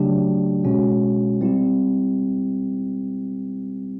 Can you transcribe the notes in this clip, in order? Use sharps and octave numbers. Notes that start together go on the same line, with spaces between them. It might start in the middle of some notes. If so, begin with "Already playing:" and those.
Already playing: C#3 F#3 A3 D4 G4
B2 G#3 C#4 F#4
G3 C4 E4 G4